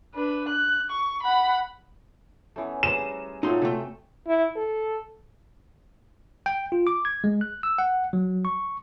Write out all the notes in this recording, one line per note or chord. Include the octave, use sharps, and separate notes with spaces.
D4 B4
F#6
C#6
F#5 B5
E3 A3 B3 C#4 A4
G3 G#4 B4 C5 A#5 E7
A#2 F#3 A3 C4 D#4 F#4 C6
C3 A3 A4 G5
E4
A4
G5
F4
D6
G#6
G#3
F#6
E6
F#5
F#3
C#6